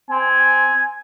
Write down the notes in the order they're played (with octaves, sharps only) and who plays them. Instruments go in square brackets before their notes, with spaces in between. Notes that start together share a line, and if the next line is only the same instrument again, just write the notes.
[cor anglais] C4 [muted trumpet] G#5